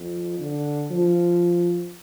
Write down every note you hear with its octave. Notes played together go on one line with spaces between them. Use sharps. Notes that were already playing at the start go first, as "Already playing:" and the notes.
Already playing: F2
D3
F3